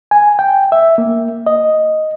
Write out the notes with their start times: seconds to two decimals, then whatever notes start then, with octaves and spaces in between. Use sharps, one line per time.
0.11 G#5
0.39 G5
0.72 E5
0.98 A#3
1.46 D#5